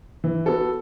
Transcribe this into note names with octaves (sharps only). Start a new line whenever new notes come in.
E3
B3 F#4 A4